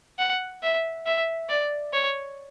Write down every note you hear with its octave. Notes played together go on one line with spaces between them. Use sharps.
F#5
E5
E5
D5
C#5